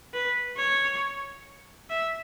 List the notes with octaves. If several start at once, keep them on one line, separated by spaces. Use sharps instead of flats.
B4
C#5
E5